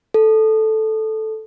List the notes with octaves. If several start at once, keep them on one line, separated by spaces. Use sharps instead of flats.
A4